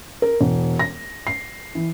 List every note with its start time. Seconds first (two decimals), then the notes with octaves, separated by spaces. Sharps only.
0.22 A#4
0.41 E1
0.79 A#6
1.27 C7
1.75 E3